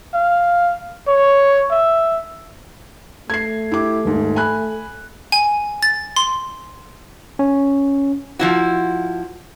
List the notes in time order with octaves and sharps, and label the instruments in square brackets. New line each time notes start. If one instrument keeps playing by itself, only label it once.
[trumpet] F5
C#5
E5
[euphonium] A3 [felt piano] G#6 C7
[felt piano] E4 G4 D6
D#1 G#2
G#5 B5 F#6
[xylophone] G#5
A6
C6
[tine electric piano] C#4
[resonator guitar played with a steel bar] F3 E4 F#4